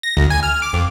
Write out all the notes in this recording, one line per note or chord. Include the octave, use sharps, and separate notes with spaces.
A#6
D2
G#5
F6
D6
F2